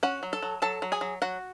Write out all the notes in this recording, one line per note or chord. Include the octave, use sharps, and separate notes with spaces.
C#4 F#4 F#5
F#3
A4 A5
F#3
F#3 A4 A5
F#3
G#4 G#5
F#3
F#3 F#4 F#5